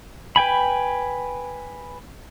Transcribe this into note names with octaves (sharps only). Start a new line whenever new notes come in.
B4 G5 G#5 B5